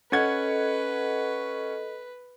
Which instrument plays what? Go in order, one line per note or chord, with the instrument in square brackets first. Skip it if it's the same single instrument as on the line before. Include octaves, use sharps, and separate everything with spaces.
[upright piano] C#4 F#5 G#6 [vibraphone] A4 D#5 [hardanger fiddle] B4